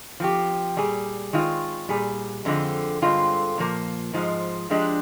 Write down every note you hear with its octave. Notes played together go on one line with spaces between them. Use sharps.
F3 C4 G4
A#2 G3 G#4
D#3 G#3 C4 F4
A#2 G3 G#4
F2 D3 G#3 C4 F4
G2 D3 G#3 C4 F4
A#2 F3 A#3
G#2 F3 G#3
F3 G#3 D4 G4